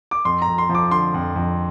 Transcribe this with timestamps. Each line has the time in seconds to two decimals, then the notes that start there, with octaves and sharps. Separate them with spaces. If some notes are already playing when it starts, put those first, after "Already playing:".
0.11 D6
0.25 F2 C6
0.42 A#5
0.47 F2
0.58 C6
0.69 F3
0.75 D6
0.91 D3 C6
1.14 F2
1.36 F2